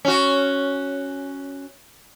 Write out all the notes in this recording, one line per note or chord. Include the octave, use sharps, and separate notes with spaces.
C#4 F#4